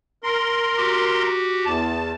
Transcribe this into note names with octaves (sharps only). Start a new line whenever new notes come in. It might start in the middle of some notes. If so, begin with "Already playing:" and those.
A#4 C6
F#4 G4
E2 A5